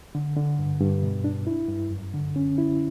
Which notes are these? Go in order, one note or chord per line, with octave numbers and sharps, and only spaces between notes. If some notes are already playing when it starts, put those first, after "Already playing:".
D3
D3
G2
G2
B2
D4
E4
G2
F#2
D3
C#4
E4